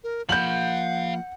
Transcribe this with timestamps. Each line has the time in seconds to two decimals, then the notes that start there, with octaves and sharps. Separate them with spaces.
0.04 A#4
0.29 F3 A#3 F5 F#5 B5 G6 F#7